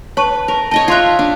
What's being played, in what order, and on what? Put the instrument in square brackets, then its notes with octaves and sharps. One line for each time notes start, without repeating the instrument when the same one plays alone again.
[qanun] B4 [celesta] C#5 A5 C#6
[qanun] A#4
[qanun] C#5 D#5 G5 [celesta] A5
[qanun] F4 E5 [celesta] F5 C6 F#6
[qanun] D4